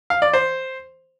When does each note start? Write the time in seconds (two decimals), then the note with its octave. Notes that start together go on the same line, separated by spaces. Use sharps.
0.10 F5
0.22 D5
0.34 C5